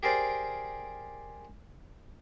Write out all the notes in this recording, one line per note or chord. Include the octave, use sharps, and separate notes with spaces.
G4 G#4 A#4 C5 D5